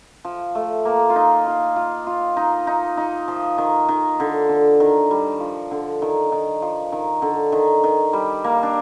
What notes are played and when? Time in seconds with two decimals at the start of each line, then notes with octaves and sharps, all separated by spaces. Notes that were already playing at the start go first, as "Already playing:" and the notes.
0.25 F3
0.55 A3
0.85 A#3
1.10 F4
1.16 D#4
1.46 F4
1.76 F4
2.07 F4
2.37 D#4
2.67 D#4
2.97 D#4
3.28 F3
3.58 D#3
3.88 D#3
4.20 D3
4.49 D3
4.80 D#3
5.11 G3
5.40 F3
5.71 D3
6.02 D#3
6.32 D#3
6.62 F3
6.92 D#3
7.22 D3
7.52 D#3
7.84 D#3
8.13 G3
8.44 A#3
8.63 D4